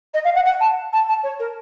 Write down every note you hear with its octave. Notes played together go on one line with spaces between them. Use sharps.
D#5
F5
F#5
F#5
A5
A5
A5
C#5
A#4